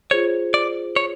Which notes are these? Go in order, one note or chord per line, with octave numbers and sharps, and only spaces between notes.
F4 G#4 C5 C#5
D5
C#5